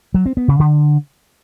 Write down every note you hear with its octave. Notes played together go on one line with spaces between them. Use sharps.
F#3
C4
B3
C#3
D3